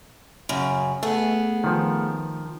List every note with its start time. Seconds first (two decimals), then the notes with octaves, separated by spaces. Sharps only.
0.49 F#2 C#3
1.03 A3 B3 G#4
1.64 D#3 F3